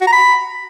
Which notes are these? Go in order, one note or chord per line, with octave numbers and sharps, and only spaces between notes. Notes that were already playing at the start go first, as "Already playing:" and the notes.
F#4
A#5
B5